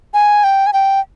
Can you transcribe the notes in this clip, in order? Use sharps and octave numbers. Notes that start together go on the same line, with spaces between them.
G#5
G5
G#5
G5